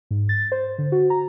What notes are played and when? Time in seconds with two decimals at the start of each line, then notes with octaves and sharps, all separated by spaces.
0.11 G#2
0.29 A6
0.52 C5
0.78 D3
0.92 F#4
1.10 A#5